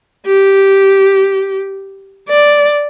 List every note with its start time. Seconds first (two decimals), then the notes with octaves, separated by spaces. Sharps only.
0.26 G4
2.29 D5